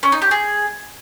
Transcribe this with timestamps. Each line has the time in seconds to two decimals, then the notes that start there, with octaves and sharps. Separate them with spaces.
0.03 C#4
0.12 D#4
0.22 G4
0.31 G#4